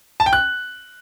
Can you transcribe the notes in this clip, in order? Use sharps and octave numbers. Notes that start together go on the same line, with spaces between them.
A5
G5
F#6